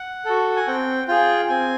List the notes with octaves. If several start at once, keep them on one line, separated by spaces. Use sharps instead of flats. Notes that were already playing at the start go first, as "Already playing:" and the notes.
Already playing: F#5
F#4 A4
G#5
C4 G5
F4 G#4 G5
C4 G#5